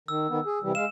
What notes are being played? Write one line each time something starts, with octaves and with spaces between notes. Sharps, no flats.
D#3 E6
D#3 B3
G#4
C3 E3 G3
G#3 F5 E7